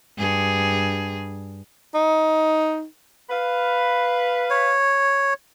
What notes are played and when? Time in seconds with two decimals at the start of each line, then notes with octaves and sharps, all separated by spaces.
0.18 G2 G#4
1.94 D#4
3.30 B4 F5
4.50 C#5